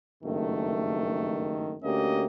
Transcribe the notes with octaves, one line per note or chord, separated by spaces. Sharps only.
F#1 G2 D#3 A3
D2 A#3 C#4 G4 D#5